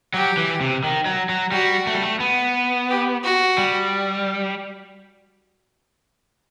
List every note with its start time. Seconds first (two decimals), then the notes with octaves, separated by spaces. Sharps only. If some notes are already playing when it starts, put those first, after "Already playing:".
0.14 F#3 G4
0.37 E3
0.61 C3
0.84 D#3
1.06 F#3
1.29 F#3
1.52 G3 F#4
1.87 A3
1.95 G3
2.02 A3
2.20 B3
2.90 G4
3.23 F#4
3.58 G3